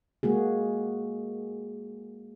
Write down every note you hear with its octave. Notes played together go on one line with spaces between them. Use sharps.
G#3 A#3 F#4 G#4